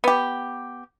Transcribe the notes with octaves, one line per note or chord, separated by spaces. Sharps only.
B3 G4